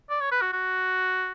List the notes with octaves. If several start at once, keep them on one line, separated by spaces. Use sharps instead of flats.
D5
C#5
B4
F#4
F#4